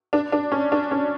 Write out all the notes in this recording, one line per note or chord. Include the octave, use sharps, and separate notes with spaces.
D4
D4
C#4
D4
C#4